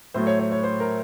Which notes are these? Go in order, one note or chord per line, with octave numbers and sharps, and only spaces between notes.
A2 F#3 A3 C5
C#5
C#5
C#5
C5
A#4